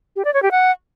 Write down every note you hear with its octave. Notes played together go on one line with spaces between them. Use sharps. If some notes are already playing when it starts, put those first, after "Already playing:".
G4
D5
C#5
G4
F#5